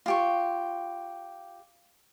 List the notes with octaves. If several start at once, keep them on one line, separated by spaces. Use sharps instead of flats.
F4 G4 C#6